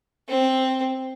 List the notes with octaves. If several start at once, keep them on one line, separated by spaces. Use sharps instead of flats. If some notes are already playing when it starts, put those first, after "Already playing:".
C4